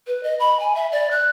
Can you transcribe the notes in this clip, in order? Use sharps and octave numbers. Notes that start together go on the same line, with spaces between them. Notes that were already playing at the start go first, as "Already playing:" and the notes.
B4
D#5
B5
G#5
E5
D5
F#6